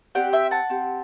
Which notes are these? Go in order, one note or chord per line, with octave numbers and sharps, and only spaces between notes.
C4 G4 D5 F#5
E5 G5
F#5 A5
C4 G4